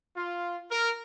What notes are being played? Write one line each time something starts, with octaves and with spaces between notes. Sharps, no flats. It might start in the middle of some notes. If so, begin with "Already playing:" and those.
F4
A#4